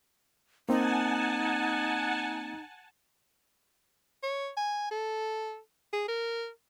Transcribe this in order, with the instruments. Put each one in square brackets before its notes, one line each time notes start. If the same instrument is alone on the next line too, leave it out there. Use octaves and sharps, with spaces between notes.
[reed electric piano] A#3 C4 [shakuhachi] D#4 [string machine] F#5 G#5 A5
[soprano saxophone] C#5
G#5
A4
G#4
A#4